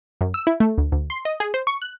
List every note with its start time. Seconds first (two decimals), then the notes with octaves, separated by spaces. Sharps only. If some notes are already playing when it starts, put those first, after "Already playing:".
0.21 F#2
0.34 E6
0.47 E4
0.60 A3
0.78 D2
0.92 D2
1.10 C6
1.25 D#5
1.40 G#4
1.54 C5
1.67 C#6
1.82 F#6